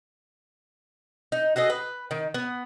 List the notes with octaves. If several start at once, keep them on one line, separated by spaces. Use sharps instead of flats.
D#4
F#4 G#4 A4 D#5
B4
D#3
B3